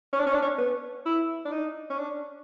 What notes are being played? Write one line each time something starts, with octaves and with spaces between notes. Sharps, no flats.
C#4
D4
C#4
D4
C#4
B3
E4
D4
D#4
C#4
D4